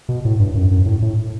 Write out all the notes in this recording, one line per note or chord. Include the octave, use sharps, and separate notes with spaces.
B2
A2
G2
F#2
F#2
A2
A2